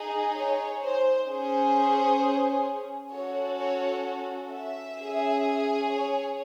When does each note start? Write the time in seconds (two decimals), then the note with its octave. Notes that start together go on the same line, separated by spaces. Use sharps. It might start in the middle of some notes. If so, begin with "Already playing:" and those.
Already playing: D#4 G#4
0.36 C#5
0.83 C5
1.29 C#4 G#4 C5
3.13 C#4 F#4 A4 C#5
3.59 C#5
4.51 E5
4.98 C#4 G#4
5.89 C#5